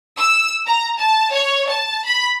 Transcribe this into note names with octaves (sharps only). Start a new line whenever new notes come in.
E6
A#5
A5
C#5
A5
B5